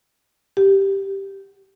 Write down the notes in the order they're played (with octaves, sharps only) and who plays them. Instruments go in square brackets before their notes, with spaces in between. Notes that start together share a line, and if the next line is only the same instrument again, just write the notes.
[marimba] G4